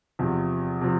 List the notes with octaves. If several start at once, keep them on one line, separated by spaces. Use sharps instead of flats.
E2 C3 F3
C3 F3